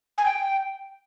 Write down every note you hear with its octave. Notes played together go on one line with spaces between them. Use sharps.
G#5
G5